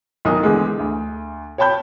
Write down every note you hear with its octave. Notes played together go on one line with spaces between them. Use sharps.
B1 D#3 D#4 D#6
E2 D3 G#3
D2
C#5 G5 A5 B5 G6